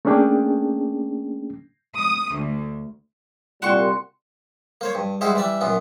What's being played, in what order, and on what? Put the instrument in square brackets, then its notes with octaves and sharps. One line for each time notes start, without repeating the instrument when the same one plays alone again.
[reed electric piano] A3 A#3 C#4 D4 G#4 G5
[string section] D#6
D2
[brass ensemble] C2 A#2 G3 [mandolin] F#4 C6 C#6
[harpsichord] A#3 C5 C#5
G2
G3 G#3 E4 F#4 C5
E3 G3 D5 E5
F#2 A#2 B3